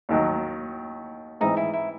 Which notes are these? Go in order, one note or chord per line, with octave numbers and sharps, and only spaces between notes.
D#2 D#3 F#3
G#2 E3 C4 D#4
E4
E4